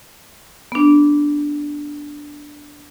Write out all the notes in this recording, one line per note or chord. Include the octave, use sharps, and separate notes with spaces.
B3 D4